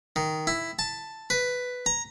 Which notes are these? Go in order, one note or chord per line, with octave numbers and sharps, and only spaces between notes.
D#3
E4
A5
B4
A#5